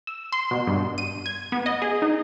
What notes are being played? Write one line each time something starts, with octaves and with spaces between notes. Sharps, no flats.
E6
C6
B2
G2
D#7
G#6
B3
D#5
G#4
D#4